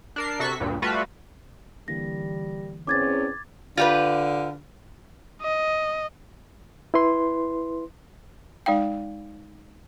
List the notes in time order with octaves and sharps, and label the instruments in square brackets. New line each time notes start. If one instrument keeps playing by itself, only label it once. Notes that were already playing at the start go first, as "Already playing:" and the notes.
[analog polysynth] D4 A#4 C7
C3 F#4 A4 C#6 B6
D2 G2 A#2
G3 A3 F4 F#4 B4
[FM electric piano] D3 E3 A#3 [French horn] G3 [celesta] A#6
[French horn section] E2 C4 C#4 [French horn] G#4 [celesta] D6 G#6 A6
[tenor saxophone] D3 [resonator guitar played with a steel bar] F4 G4 B4
[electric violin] D#5
[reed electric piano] E4 B4 C6
[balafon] G#3 D#4 F5 G5